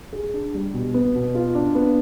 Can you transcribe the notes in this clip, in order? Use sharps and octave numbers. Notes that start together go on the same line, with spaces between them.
G#4
D4
G3
B2
B3
B2
F4
D4
B3